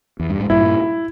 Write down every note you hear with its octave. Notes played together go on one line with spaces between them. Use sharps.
E2
G2
G#2
G2 A#2 E4